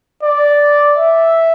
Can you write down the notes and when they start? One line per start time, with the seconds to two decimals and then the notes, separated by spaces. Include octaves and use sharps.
0.23 D5
0.97 E5